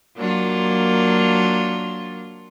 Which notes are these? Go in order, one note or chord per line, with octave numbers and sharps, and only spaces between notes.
F#3 A#3 D4 F4